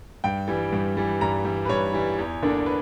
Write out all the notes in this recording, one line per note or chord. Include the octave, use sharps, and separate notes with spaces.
G2 G5
E3 G3
G2
E3 G3
G2 A#5
E3 G3
B4
G2 C#5
E3 G3
E2
D3 A#3 D4
B4